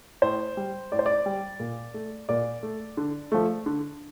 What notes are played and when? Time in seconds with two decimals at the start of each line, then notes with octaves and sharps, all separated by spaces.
0.22 A2 C5
0.57 G3
0.92 A2 D5
0.99 C5
1.06 D5
1.26 G3
1.60 A#2
1.94 A3
2.29 A#2 D5
2.63 A3
2.97 D3
3.32 F3 A3
3.66 D3